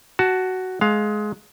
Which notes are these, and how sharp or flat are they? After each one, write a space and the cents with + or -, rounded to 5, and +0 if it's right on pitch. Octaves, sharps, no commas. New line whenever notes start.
F#4 +10 A5 +0
G#3 +20 F5 +10